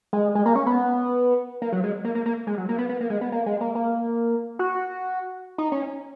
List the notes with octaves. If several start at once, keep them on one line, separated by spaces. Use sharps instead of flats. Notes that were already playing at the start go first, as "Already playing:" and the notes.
G#3
G#3
A#3
C#4
B3
A#3
F#3
G#3
A#3
A#3
A#3
G#3
F#3
A#3
B3
B3
A#3
G#3
B3
A#3
G#3
A#3
A#3
F#4
D#4
C#4